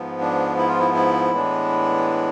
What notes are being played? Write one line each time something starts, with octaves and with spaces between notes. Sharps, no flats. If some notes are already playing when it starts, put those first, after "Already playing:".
Already playing: G#2 F3 B3
D4
E4
F4
E4
E4
A2 E3 G#3 B3 D4